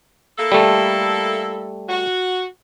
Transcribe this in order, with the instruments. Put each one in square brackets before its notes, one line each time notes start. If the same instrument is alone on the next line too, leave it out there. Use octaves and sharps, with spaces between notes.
[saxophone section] A#3 E4 A4
[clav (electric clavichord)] G3 A3
[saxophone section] F#4